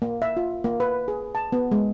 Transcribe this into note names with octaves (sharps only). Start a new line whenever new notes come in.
A#3
E5
F4
A#3
B4
G#4
A5
B3
G#3